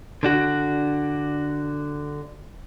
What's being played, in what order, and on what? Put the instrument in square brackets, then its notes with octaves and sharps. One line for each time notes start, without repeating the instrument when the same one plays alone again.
[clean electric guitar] D3 D4 F#4